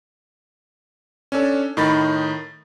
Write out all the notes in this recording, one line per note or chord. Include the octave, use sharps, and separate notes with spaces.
C#4 D4 A4
A2 D#3 D#4 B5 A6